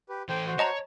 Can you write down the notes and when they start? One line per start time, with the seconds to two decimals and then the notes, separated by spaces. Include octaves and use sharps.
0.09 G4 B4
0.29 E3 A4 C5 G5
0.47 F#4 C5
0.59 C#5 D#5 A5 A#5